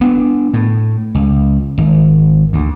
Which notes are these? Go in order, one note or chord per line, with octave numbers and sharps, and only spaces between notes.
B3 D4
A2
C#2
G#1
D2